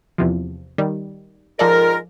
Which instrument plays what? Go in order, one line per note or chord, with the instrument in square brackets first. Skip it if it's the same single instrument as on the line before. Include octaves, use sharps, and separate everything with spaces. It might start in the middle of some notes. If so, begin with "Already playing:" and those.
[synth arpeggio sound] E2 C3 F3
D#3 G3
[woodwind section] G#2 F4 A#4 [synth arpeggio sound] F3 A4 D5